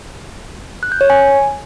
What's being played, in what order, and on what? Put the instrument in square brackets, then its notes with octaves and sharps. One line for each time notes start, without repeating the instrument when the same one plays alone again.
[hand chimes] F#6
G6
C#5
G#5